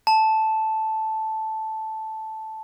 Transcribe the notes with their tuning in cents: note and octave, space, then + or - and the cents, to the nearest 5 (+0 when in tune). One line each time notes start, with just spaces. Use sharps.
A5 -5